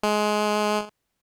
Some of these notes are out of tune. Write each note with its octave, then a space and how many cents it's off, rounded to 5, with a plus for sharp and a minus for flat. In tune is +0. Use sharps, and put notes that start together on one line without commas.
G#3 +20